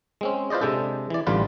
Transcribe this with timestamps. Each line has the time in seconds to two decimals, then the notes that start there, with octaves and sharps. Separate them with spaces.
0.21 G#3 C4 C#4
0.50 F4 B4 C5 D5 D#5
0.61 C3 G#3 D4 A4
1.10 E3 D5
1.27 A1 D3 G3 F4 B4